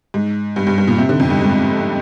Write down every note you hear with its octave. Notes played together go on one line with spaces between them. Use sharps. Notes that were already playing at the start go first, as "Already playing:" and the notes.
G#2
G2
G2
G2
A#2
C3
D3
F2
G2
G#2